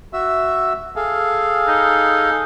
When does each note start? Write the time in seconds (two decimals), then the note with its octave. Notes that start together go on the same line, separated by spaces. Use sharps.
0.13 F#4 E5 E6
0.96 G#4 A4 F5
1.68 D#4